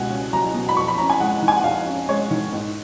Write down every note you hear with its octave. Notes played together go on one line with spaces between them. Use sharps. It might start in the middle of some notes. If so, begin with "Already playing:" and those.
Already playing: C#2 B2 F#5 G#5
C#4
F#3 A#5
B2
B5
F2 C#6
B5
C#4 A#5
G#5
G#3 F#5
D#3
G#5
F#5
F2 F5
C#4
G#3 C#5
D#3
G#2